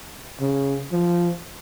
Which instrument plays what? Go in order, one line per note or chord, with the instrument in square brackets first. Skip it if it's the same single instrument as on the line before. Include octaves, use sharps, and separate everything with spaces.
[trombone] C#3
F3